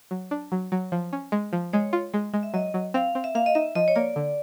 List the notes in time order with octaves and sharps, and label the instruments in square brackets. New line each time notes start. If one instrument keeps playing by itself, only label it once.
[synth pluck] F#3
D4
F#3
F#3
F3
C#4
G#3
F3
[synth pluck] G#3 [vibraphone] C#5
[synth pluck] F4
G#3
G#3
[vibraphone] E5
[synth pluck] F#3 [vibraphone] D#5
[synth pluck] F#3
[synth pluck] C4 [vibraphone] F5
[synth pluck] C4
[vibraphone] E5
[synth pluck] A#3 [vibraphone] F5
[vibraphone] D#5
[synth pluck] D#4 [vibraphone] E5
[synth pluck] F3 [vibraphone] D#5
[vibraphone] C#5
[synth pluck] A#3 [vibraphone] D5
[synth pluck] D3